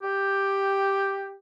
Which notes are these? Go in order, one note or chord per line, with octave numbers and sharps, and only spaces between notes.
G4